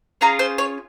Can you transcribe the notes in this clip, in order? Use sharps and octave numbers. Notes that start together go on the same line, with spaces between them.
C#4 F4 G#4 A#5
C5
C#5